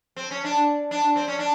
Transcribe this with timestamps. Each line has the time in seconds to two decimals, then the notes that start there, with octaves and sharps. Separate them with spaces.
0.16 C4
0.31 C#4
0.44 D4
0.91 D4
1.16 C4
1.28 C#4
1.39 D4